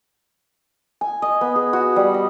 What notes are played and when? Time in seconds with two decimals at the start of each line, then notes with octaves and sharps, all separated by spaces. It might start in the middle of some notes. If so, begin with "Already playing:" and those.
1.01 G#5
1.22 D#5
1.41 B3
1.56 G#4
1.73 F#4
1.96 G3
2.14 D#5